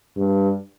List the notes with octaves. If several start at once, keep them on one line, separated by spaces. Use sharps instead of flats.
G2